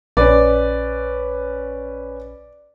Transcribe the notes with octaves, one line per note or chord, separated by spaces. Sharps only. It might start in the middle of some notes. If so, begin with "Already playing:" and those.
A#1 C#4 B4 D5